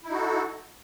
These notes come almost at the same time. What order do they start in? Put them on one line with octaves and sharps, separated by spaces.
E4 D#4 F#4 A4